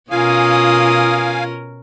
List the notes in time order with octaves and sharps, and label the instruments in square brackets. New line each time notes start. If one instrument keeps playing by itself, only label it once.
[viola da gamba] B2 C#4 A#4 [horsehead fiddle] F4 [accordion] F5 G#5 [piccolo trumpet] D#6